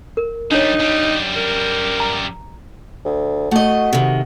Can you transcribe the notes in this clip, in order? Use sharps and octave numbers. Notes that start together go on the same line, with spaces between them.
A#4
D#3 G3 D4 D#4 C#5
F#2 G3
A#4
A#5
D2
A3 F#4 D#5
C3 D#3